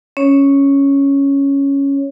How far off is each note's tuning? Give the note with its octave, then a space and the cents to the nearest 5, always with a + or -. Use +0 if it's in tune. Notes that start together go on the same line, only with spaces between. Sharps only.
C#4 +0 C#5 +0